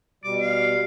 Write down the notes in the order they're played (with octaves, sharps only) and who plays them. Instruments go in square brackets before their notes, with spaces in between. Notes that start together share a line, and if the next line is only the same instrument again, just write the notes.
[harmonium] B2 G3 [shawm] D6
[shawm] F5